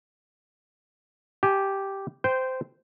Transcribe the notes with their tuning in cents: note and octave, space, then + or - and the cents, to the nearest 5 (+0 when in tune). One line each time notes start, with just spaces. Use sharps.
G4 -5 G#5 +25
C5 -15 G5 +0